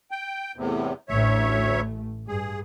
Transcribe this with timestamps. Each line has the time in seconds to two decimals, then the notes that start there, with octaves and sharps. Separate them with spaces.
0.11 G5
0.56 E2 A2 C3
1.09 A1 D2 A2 A3 C#5 E5
2.28 G2 G#4